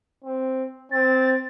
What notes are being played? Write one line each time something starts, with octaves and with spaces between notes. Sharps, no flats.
C4
C4 A6